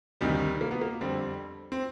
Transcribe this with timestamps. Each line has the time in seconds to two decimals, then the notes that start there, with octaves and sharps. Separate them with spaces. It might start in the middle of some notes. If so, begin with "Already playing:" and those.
0.21 D2 C3 D#3 G3
0.61 A#3
0.71 B3
0.81 A#3
1.01 F2 D3 G3 C4
1.72 C4